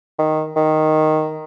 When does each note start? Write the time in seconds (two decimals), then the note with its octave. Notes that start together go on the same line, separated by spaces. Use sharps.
0.19 D#3
0.57 D#3